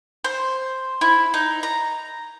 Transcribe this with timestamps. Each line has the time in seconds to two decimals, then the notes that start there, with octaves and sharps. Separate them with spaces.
0.24 C5
1.01 E4
1.34 D#4
1.63 A#5